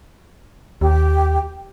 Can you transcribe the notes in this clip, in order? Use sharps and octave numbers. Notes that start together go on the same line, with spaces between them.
D#2 G4